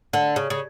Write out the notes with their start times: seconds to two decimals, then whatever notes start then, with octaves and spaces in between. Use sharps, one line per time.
0.13 D3
0.36 C#3
0.50 C#3